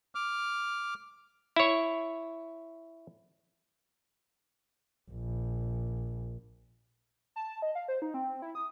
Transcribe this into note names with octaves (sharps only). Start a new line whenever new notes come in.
D6 F6
E4 C#5
A#1
A5
D#5
F5
C5
D#4
C4
E4
D#6